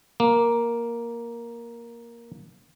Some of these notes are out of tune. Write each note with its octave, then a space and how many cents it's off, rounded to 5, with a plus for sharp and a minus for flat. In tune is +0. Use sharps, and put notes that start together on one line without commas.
A#3 +5